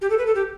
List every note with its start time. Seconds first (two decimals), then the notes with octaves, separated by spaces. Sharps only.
0.02 G4
0.10 A4
0.18 B4
0.26 A4
0.35 G4